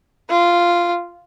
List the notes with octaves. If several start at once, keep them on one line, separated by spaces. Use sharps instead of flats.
F4